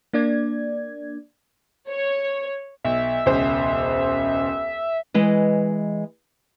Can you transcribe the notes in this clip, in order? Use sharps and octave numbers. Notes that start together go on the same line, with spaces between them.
A#3 D4 D5 G#6
C#5
B1 E5
E1 C#2 C5
E3 G#3 B4 D#5